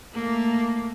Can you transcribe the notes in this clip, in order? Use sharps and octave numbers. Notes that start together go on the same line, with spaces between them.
A3 A#3